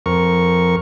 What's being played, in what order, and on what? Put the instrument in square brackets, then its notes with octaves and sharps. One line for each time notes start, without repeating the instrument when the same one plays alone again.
[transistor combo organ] F2 A#4 C#6